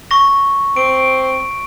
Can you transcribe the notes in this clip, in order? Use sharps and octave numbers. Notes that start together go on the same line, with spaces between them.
C#6 A#6
C4 D7